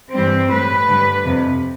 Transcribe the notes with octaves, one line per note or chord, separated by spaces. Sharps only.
G2 E3 G3 C4
A2 G3 B4
G2 D3 G3
F2 C3 F3